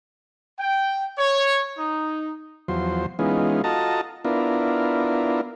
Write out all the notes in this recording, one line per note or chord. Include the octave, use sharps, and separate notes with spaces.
G5
C#5
D#4
E2 F3 F#3 C5
E3 G#3 B3 C#4 D#4 F4
F4 F#4 A4 D#5 A5 A#5
B3 D4 E4 F4 A#4